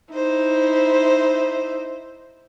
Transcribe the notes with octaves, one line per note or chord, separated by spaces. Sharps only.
D#4 E4 C5